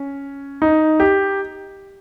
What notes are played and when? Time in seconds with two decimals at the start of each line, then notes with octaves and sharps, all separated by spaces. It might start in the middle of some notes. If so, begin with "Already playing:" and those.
Already playing: C#4
0.62 D#4
1.00 G4